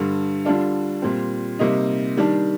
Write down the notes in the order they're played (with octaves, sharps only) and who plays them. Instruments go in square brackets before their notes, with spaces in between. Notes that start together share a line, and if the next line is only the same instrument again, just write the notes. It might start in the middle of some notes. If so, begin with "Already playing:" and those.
Already playing: [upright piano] G2 D3 G3
D3 G3 D4 F4
A#2 G3 C4
C3 G3 A#3 D#4
D#3 G3 D4